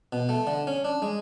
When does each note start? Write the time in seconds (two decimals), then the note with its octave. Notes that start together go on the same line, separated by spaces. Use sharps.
0.13 B2
0.29 A3
0.47 D3
0.67 C#4
0.84 D4
1.02 G#3